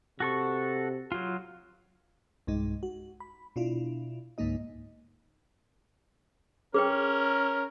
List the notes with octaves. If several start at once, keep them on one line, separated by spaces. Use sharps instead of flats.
C3 F#4 A4 C#6
F#3 F4
B1 G2 G#3 D#4
F#4
B5
B2 D4 E4 F4
C#2 G#2 D3 A#3 D#4 D#5
C#4 G#4 A#4 B4 G5